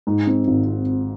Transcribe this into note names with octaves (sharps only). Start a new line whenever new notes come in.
G#2
C4
G#1